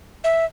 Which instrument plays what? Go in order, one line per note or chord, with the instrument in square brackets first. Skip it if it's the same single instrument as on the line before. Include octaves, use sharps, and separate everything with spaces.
[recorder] E5